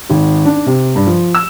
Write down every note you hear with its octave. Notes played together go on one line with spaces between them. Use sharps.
G#1
D4
C3
G2
F3
E6